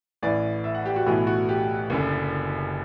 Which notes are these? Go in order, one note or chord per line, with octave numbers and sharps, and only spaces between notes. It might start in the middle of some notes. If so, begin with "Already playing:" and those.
A1 A2 E3 D5
E5
F#5
G4
F#4
B1 A2 E3 F#4
F#4
G4
F#1 F#2 D3